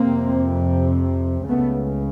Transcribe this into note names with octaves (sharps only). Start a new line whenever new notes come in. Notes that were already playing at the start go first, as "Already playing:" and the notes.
Already playing: F2 C3 A#3 C4
C#2 C#3 A3 B3